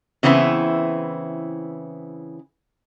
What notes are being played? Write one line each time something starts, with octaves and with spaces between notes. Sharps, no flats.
C#3 E3 B3 C4 E4